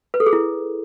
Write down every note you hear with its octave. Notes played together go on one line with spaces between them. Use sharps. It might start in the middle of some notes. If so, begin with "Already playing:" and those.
B4
A4
G#4
E4